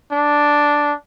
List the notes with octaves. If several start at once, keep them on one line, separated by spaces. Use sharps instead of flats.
D4